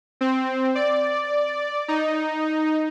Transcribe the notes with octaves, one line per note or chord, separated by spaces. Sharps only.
C4
D5
D#4